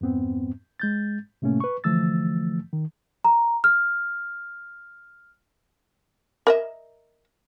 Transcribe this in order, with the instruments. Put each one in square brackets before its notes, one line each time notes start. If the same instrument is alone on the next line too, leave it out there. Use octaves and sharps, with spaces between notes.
[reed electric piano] F2 G#2 B3 C4
G#3 G6 A6
A2 C3 A3 A#3 C#4
B4 C#6
D3 E3 F3 A3 E6 A6
D#3
[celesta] A#5
F6
[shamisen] A#4 D#5 E5